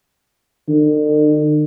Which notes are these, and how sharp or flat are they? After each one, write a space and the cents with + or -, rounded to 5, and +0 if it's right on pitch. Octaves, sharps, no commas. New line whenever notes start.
D3 +45